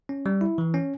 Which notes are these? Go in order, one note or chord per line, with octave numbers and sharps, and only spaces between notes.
C#4
G3
E4
E3
C#4